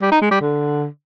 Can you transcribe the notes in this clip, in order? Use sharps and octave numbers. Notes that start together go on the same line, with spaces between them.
G3
D#4
G#3
G3
D3